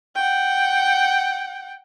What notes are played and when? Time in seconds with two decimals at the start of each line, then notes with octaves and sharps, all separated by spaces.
0.15 F#5 G5